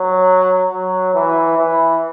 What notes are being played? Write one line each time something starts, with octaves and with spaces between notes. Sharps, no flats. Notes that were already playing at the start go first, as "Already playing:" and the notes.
Already playing: F#3
F#3
E3
E3